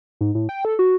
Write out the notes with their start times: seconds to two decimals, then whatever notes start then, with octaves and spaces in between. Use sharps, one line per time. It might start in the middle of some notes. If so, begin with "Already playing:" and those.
0.21 G#2
0.35 A2
0.49 G5
0.65 A4
0.79 F#4